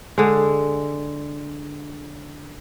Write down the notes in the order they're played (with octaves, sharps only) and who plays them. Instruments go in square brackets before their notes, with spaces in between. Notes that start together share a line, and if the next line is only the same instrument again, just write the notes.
[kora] D3 G#3